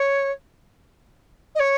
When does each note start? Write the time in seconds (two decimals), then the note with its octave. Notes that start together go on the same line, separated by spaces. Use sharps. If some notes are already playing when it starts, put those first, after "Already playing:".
Already playing: C#5
1.55 D#5
1.59 C#5